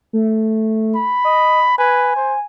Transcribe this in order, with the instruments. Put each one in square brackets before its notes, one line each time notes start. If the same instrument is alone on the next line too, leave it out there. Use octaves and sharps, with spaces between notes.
[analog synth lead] A3
[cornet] B5
[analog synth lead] D#5
[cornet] B4 [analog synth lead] G#5
[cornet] C5